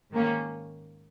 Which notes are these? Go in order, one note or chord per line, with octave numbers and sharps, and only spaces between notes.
G#2 D#3 A#3 C#4